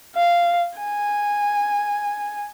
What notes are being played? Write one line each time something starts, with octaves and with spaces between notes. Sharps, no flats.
F5
G#5